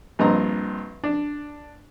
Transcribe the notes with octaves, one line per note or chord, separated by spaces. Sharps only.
A#1 G2 C4 D#5 A#5
D4